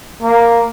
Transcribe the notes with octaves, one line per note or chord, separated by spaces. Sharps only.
A#3